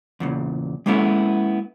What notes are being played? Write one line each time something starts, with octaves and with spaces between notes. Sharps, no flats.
E2 A#2 C#3
G#3 A#3 B3 C#4 E4 A4